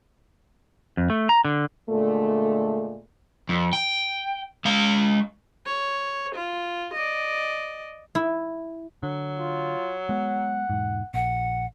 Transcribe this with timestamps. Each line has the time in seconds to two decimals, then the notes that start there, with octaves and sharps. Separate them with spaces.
0.97 F2
1.10 A3
1.29 A#5
1.45 D3
1.90 A#2 D3 G#3 A3
3.49 F2
3.73 G5
4.65 G#3 F5
5.66 C#5
6.35 F4
6.93 D5 D#5
8.15 E4
9.03 D3 F#3
9.39 F4
10.09 G#3 B3 F#5
10.70 E1 G#2
11.14 A#1 F#5